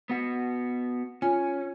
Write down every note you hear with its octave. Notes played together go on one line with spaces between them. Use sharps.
B3 F#4
C#4 F4 G#5